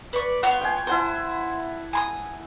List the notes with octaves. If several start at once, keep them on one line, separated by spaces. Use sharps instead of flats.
B4 D5 C#6
B3 F4 C#5 F#5
G5 G#5
E4 C5 F#5 A5
G#5 C6 D#6